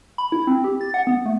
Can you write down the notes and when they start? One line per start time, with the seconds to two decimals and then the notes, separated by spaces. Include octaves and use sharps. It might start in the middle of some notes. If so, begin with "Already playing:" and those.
0.18 B5
0.32 E4
0.47 C4
0.64 G4
0.81 A6
0.94 F#5
1.07 B3
1.26 A3